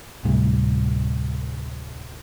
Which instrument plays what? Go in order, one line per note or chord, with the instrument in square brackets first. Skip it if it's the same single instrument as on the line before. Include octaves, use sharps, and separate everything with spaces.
[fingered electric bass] D2 A2 C3 G3